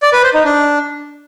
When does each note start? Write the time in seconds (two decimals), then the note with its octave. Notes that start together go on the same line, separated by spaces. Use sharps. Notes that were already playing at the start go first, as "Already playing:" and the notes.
0.03 D5
0.13 B4
0.23 C5
0.34 D#4
0.44 D4